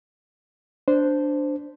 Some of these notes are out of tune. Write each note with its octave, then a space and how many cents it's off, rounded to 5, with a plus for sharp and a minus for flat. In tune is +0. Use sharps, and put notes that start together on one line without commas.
D4 +0 C5 -10